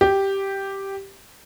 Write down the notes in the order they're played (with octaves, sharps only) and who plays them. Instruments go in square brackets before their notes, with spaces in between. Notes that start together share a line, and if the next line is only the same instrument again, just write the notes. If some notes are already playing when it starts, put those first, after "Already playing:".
[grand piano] G4